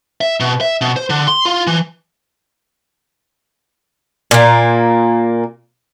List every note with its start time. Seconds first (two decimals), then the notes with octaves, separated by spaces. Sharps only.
0.21 E5
0.40 B2
0.61 E5
0.81 B2
0.96 C5
1.10 D3
1.28 C6
1.46 F4
1.67 E3
4.31 A#2 A#3